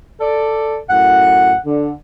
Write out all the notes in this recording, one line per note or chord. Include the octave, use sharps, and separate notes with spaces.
A4 D5
F#2 A2 F#5
D3